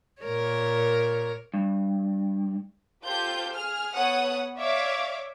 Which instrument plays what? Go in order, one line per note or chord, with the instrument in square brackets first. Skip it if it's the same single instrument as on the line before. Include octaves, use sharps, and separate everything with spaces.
[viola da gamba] A#2 A#4 C#5
[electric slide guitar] G2
[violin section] F4 G4 A4 C5 G6
G#4 F6
B3 A4 C#5 F#5 D#6
C#5 D5 E5 F5 D6